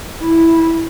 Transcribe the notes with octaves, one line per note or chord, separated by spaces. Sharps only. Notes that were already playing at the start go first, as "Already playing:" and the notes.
E4